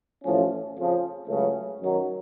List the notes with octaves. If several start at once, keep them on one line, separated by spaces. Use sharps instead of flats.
A1 A2 F3 A3 C#4
F2 C#3 F3
C#2 C#3 F#3 A3
F#2 D#3 F#3